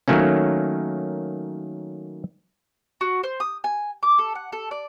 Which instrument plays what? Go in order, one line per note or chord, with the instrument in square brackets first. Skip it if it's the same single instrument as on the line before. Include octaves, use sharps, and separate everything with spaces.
[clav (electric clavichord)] D#3 F#3 A3 A#3 C#4
[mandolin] F#4
C5
D#6
G#5
D6
A4
F#5
A4
D5